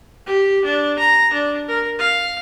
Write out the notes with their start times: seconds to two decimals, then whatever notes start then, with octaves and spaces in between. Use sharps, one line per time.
0.26 G4
0.65 D4
0.99 A#5
1.33 D4
1.68 A#4
1.99 F5